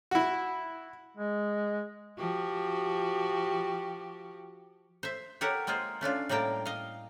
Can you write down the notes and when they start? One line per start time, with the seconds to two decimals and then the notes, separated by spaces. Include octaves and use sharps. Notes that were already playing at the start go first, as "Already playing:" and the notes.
0.11 E4 F#4
1.17 G#3
2.17 F3 F#4 G4
5.03 C5 E5
5.41 G4 A4 A#4 C#5 F#5
5.67 G#3 A#3 F4 G#4 C5
6.01 A3 C#4 D4 F4
6.29 A2 G3 A#3 A#4 G5 A5
6.65 D#5 F5